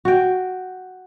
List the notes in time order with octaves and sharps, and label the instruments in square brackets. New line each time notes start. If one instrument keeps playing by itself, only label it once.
[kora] F#4 G5